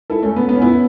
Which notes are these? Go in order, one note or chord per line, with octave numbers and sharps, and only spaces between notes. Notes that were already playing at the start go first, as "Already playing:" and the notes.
E4 A4
A3 C#4
B3
B3
C#4
B3 E4